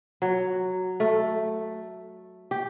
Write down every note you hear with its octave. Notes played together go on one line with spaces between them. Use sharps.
F#3
A3
G4